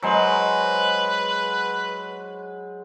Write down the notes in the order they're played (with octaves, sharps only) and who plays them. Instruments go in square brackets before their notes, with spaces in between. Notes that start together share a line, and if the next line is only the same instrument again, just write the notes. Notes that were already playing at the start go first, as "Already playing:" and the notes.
[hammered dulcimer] F#3 G#3 C5 [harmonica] B4